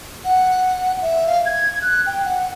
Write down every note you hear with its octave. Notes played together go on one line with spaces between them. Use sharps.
F#5
E5
F5
G#6
F#6
G5
F#5